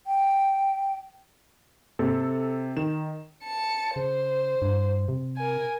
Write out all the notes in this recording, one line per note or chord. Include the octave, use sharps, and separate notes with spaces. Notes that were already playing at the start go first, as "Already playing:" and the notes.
G5
C3 A4
D#3 E7
A5 C#7
C#3 C5
G2
C3
A#4 G#5